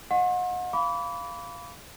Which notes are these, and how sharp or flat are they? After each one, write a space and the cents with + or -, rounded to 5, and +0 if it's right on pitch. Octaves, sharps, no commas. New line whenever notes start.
D#5 +0 F#5 -35 C6 +45
F5 -10 B5 +0 D6 -30